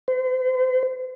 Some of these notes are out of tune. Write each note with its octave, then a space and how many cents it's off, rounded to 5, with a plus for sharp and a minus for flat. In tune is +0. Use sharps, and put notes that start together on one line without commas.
C5 -40